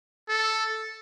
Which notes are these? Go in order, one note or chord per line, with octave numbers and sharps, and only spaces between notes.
A4